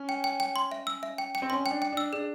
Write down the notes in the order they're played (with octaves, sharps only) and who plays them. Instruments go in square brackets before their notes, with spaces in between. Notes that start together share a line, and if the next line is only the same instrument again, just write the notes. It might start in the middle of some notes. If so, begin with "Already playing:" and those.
Already playing: [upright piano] C#4
[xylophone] G5
G5
G5
C6
E5
E6
E5
G5
G5
[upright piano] C4
[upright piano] C#4 [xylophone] C6
[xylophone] G5
[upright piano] D4
[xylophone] G5
[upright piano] D4 [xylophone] E6
[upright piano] D4 [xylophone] G#4